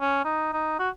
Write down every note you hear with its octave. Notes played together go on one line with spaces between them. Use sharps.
C#4
D#4
D#4
F#4